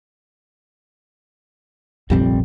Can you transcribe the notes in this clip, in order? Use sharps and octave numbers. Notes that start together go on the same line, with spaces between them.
F1 A#1 F2 G3 C4